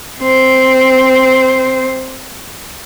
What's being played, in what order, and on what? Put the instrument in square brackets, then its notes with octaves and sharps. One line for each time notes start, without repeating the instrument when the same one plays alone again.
[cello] C4 C5